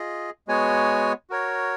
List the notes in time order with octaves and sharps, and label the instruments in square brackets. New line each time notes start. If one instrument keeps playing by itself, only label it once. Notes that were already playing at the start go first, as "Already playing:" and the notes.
Already playing: [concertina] F4 G#4 D#5
G#3 B3 F#4 C#5 G#5
F#4 A#4 C#5